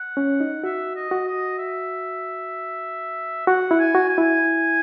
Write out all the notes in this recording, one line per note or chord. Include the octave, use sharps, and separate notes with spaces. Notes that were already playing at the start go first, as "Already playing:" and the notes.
Already playing: F#5
C#4
D#4
F#4 E5
D#5
F#4
D#5
E5
F#4 F#5
E4
G#5
F#4
G#5
E4